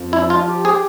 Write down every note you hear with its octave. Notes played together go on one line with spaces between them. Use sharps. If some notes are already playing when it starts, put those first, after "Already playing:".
Already playing: F2
F3 E4
F4
G4
G#4